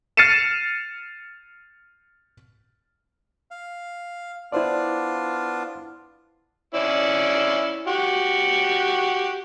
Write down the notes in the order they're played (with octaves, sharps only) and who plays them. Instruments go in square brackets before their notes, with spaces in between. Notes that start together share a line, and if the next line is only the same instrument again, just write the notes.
[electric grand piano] F6 A6 C7 C#7 D#7 E7
[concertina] F5
[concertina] B3 D4 F4 [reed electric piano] E4 C5 D5
[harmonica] C#4 E4 D5
F#4 G4